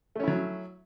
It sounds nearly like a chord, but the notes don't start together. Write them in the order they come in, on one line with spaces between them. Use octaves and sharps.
A3 C#4 E4 F#3